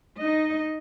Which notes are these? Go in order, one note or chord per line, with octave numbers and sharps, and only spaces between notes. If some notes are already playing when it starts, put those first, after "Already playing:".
D#4 D#5